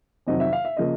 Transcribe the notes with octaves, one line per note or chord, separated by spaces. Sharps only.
F2 C3 D#3 F#3 D#5
E5
F5
E5
C#3 F3 A#3 D#5